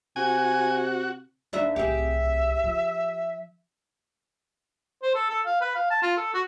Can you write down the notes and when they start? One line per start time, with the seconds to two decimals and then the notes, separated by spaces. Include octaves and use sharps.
0.16 C3 F#4 G#5
1.53 D#2 D4 E5
1.76 D1 C2 G4 G#4 E5
2.64 F3
5.02 C5
5.15 A4
5.30 A4
5.46 F5
5.61 B4
5.75 F5
5.90 A5
6.02 F4
6.17 A4
6.34 F#4